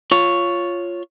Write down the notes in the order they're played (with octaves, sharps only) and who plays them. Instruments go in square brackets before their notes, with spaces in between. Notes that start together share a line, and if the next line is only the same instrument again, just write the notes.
[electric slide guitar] F4 C#5